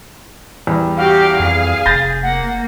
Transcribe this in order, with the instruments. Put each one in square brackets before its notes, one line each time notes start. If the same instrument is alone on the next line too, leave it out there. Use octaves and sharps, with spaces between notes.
[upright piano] E2 G3
[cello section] F#4 G4 [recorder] F5
[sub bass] F2 [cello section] G#4
[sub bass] F1 [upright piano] G6 A6 A#6
[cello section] A#3 [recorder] F#5